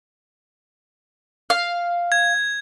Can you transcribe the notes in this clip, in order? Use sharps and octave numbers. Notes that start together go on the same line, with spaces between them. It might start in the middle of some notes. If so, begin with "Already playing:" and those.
F5
G#6